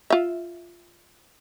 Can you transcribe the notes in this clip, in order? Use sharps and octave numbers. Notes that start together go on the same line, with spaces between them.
F4 E5